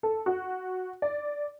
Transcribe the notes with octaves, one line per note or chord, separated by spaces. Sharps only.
A4
F#4
D5